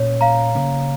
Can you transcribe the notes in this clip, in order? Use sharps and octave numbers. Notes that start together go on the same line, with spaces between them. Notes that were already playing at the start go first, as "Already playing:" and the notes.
Already playing: A#2 A#3 C#4 C#5
F5 A#5
C#3 A#3 C#4